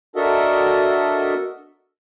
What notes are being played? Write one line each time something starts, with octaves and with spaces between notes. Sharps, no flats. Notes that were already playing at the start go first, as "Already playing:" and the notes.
D4 F#4 A4 A#4 D#5 E5